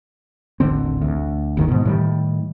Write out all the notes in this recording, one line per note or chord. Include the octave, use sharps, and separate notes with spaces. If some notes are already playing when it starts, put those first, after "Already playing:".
D#1 A1 D3 C4
D2
G1 D#2 D3 D#3
G#2 B2
A2 D#3 G3